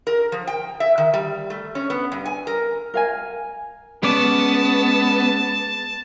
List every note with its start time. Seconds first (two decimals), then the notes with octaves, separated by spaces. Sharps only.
0.07 A#4
0.32 F3
0.47 G5
0.80 E5
0.98 D#3
1.13 G3
1.50 A3
1.75 C#4
1.90 B3
2.12 G2
2.25 G#5
2.47 A#4
2.94 A#4 F5 G#5
4.03 G#3 B3 C#4 D5 A5